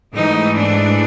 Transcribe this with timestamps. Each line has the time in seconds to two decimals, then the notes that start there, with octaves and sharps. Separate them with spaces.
0.14 G#2 E3 A3 D#4
0.55 D4